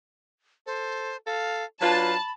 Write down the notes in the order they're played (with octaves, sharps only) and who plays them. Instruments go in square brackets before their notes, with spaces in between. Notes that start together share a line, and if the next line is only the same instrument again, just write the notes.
[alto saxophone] A4 [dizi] C5
[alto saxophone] A4 [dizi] F5
[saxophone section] F#3 D4 F4 [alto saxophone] B4 [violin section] A5 [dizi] B5